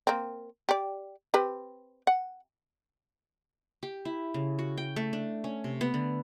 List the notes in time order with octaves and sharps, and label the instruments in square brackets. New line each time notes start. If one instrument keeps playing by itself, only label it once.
[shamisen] A#3 C4
G4 D5
C4 G4 B4
F#5
[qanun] G4
E4
C#3
F#4
G5
A3
D4
C#4
C3
B3
D3